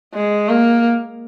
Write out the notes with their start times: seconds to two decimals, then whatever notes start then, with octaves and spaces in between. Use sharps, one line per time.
0.14 G#3
0.49 A#3